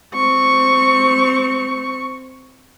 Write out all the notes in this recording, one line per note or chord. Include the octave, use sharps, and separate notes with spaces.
C4 C#6